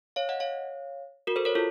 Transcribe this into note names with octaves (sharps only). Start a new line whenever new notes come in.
C#5 F5
D#5 F#5
C#5 F5
F#4 A#4
A4 C5
A#4 C#5
F4 A4